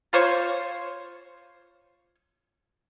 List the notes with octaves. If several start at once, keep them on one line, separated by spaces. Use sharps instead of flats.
F4 C5 C#5